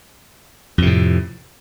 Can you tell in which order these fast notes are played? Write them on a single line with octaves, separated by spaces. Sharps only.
F2 C3 A2